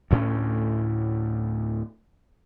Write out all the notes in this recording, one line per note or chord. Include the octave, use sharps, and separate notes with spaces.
D2 A2 A3 C#4